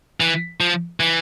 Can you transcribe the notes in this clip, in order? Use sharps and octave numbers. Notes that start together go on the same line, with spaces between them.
E3
F3
E3